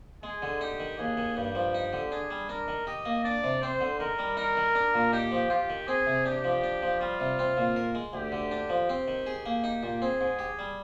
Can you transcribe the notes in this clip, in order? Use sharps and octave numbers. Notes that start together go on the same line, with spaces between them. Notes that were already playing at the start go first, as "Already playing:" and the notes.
G#3 G#4
D3
D#4 G4
D#3
D#2 G#4
D#3
G2 G4
F3
D#4
D3
D4 G#4
G3
D4 A#4
D#3
G4 D#5
A#3
D4 D5
C3
C4 C5
D3
D#3 A#4
G3
D#4 A#4
D#3
D4
A#2
D#4 G4
F3
F4 G4
D#3
C4 G#4
C3
D4 G4
F3
D4
F3
G3 F4
C3
C4
A#2
A#4
G#3
D2 G4
D3
D4
F3
C4
D#3
G#4
A#3
D#4 G4
A#2
C4 G#4
G#2
G4
G3